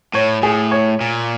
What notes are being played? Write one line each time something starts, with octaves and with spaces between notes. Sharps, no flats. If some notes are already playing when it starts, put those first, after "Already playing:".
A2 C#5
A2 G#4
C#5
A#2